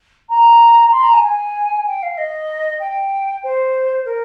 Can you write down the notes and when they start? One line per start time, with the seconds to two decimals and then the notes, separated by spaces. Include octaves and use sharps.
0.29 A#5
0.91 C6
1.02 A#5
1.13 G#5
1.24 G#5
1.87 G5
2.02 F5
2.17 D#5
2.80 G5
3.43 C5
4.05 A#4